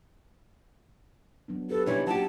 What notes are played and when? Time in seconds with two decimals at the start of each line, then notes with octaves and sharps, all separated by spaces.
1.48 F#3 B3 D4
1.70 G4 A4 B4
1.86 C3 E3 G3 D4 D#4 C#5
2.07 F#3 G4 A5